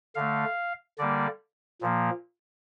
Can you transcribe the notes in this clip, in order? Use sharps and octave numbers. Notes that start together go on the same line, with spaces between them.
D3 A3 F5
D3 G3 A#3 D5
A#2 F3 A#3